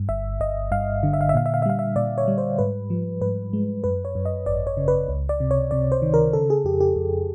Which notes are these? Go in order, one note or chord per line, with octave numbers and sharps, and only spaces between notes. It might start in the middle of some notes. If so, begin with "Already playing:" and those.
Already playing: G2
G1 E5
G1 D#5
G2 F5
D3
E5
F5
E5
A#2 F5
E5
F5
E5
G3 F5
E5
A#2 D5
C#5
G3
C5
G#2 B4
F3
G#2 B4
G#3
F#2 B4
C#5
F#2
D#5
G#1 D5
C#5
C#3
B4
C#2
D5
C3
C#5
C3 D5
C5
D#3
A#4
C#3 A4
G#4
F2 G4
G4
F2